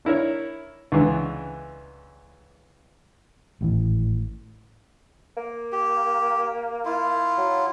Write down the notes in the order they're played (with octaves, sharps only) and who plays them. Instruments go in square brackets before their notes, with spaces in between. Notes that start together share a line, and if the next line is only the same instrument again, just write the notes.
[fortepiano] D4 E4 A#4 C#5
C#2 D3 E3
[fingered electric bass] G#1 A2 E3
[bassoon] A#3
[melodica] G4
E4 F4
[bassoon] F#3